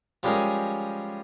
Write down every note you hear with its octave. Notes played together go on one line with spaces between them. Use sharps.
F3 G3 G#3 C#4 G#4 A#4